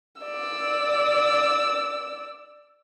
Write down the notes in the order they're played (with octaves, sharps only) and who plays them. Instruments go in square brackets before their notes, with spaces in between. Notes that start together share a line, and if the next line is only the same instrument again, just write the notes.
[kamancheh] D5 E6